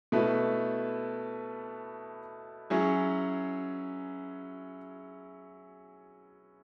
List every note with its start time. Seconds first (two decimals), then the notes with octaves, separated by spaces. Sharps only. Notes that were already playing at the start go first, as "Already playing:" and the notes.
0.12 B2 A3 E4 B4
2.70 F#3 C#4 E4 G#4